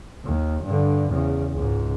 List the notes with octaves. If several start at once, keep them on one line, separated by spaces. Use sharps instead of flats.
D#2
G2 D3
E2 C#3
C#2 G#2